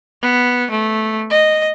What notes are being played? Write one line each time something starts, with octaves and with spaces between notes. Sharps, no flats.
B3
A3
D#5